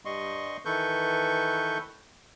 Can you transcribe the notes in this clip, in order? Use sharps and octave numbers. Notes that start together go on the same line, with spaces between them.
G2 G3 D#5 C6 C#6
D#3 E3 A4 B4 C#6 G6